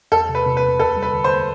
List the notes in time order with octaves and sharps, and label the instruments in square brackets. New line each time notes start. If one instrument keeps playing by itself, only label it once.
[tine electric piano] E2 [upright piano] A4
[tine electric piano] C3
[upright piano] B4
[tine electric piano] C3
[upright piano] B4
[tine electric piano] E2
[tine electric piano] D2 [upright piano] A4
[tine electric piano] G3
[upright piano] B4
[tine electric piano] D3
[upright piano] C5